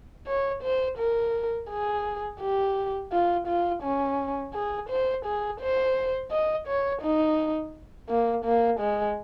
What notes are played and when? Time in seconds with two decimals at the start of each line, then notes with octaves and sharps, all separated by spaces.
0.27 C#5
0.63 C5
0.98 A#4
1.70 G#4
2.41 G4
3.12 F4
3.47 F4
3.83 C#4
4.54 G#4
4.89 C5
5.25 G#4
5.60 C5
6.31 D#5
6.67 C#5
7.02 D#4
8.10 A#3
8.45 A#3
8.80 G#3